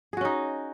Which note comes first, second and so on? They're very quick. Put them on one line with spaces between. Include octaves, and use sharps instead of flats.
G#4 F#4 C#4 D#4